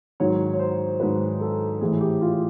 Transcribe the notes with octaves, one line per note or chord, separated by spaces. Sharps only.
G#2 D#3 F#3 C#5
C#5
C5
G#2 D#3 F#3 B4
A4
A2 E3 G#4
G4
F4